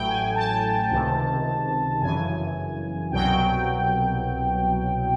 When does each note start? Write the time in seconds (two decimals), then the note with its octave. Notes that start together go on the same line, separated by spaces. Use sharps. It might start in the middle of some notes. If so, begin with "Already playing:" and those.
Already playing: A1 A2 F#3 G5
0.08 G#5
0.36 A5
0.91 C#2 C3 D#3
2.01 G1 F#2 C#3 E3 G#5
3.12 C2 B2 F#3 G5